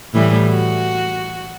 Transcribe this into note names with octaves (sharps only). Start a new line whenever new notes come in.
A2 E3 G3
F#4